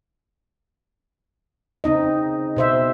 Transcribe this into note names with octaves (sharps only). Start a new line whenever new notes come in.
C#3 C4 D#4 D#5
B2 C5 E5